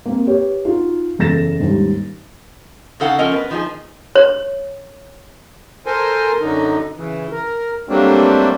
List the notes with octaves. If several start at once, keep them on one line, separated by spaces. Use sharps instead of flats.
A#3 C4
G4 B4 C#5
D#4 F4 F#4
F#1 E2 A4 A6 A#6 E7
D#2 G#2 G3
C#3 D#4 A4 F5 F#5
F3 C#4 A#4 D#5
B3 B4
D#3 F3 D#4 F#4 G#4
C#5
A4 A#4 C5 G#5
F#2 D3 D#4
C#3 E3
A#4
F#3 G3 A3 A#3 C4 D4